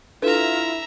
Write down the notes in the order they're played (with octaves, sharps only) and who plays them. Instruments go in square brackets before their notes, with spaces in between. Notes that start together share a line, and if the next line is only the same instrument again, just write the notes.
[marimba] D4 A4 B4 [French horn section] E4 [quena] F4 [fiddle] E5 A#5